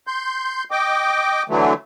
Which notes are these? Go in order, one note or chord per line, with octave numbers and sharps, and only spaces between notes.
C6 G6
D#5 G5 D6
D3 E3 F#3 A3